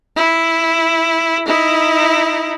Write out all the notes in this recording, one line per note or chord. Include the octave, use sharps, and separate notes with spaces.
E4
D#4 E4